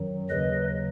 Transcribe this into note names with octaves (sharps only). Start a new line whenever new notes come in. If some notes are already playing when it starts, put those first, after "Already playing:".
Already playing: F#2 D#3 F#3
D#2 C#3 F#3 B4 D#5